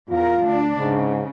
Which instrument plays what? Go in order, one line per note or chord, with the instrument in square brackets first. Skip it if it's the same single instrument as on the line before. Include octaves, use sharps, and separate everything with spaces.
[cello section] E2 A#4 [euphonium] F4
[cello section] D2 D4
[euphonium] G#2 [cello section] C#3